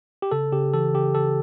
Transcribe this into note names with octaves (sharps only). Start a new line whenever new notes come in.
G4
C#3 A4
C#3 G4
E3 A4
C#3 G4
C#3 A4